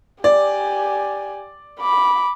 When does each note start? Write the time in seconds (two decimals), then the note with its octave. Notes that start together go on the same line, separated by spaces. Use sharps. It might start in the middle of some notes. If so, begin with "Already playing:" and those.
0.24 G4 D5 G#5
1.81 B5 D6